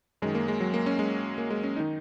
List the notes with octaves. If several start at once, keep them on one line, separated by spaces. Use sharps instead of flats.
F#2 D#3 G#3
A#3
G#3
F#3
A#3
C#4
G#3
A#3
G#3
C#4
D#3 D#4